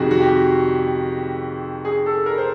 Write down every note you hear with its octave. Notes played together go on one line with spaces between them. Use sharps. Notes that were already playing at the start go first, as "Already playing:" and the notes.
Already playing: F2 C3 D#3 G3 F#4 G#4
F#4
G4
G#4
A4
A#4
C5